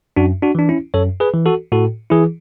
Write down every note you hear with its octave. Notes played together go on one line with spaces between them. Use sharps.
F#2 D4 F#4
D4 F#4
E3 D4
C#4 E4
F#2 A4 C#5
G#4 B4
E3
F#4 A4
A2 F#4 A4
E3 E4 G#4